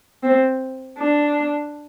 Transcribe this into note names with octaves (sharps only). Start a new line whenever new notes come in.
C4
D4